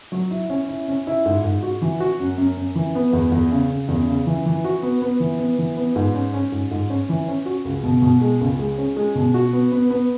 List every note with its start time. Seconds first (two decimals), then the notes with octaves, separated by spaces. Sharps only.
0.12 F#3
0.31 E4
0.50 C#4
0.68 E4
0.88 C#4
1.07 E4
1.26 G#2
1.44 G#2
1.63 F#4
1.82 E3
2.00 F#4
2.20 F#2
2.38 F#2
2.57 F#2
2.75 E3
2.95 B3
3.13 E2
3.32 E2
3.52 C#3
3.70 C#3
3.88 E2
4.07 C#3
4.26 E3
4.46 E3
4.65 F#4
4.83 B3
5.02 B3
5.20 E3
5.39 B3
5.59 E3
5.77 B3
5.96 G#2
6.15 C#4
6.33 C#4
6.52 G#2
6.71 G#2
6.90 C#4
7.09 E3
7.28 C#4
7.46 F#4
7.65 C#2
7.83 B2
8.02 B2
8.21 G#3
8.41 C#2
8.59 G#3
8.78 C#4
8.96 G#3
9.15 B2
9.34 F#4
9.53 B3
9.72 B3
9.90 B3